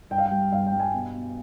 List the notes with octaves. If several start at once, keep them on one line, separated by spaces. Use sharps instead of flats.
G2 G5
F5
G5
G3
G2 F5
G5
G3
G#5
B2
B2